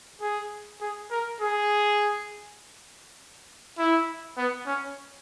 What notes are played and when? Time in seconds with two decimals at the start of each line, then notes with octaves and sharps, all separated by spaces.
0.21 G#4
0.81 G#4
1.11 A#4
1.40 G#4
3.78 E4
4.37 B3
4.66 C#4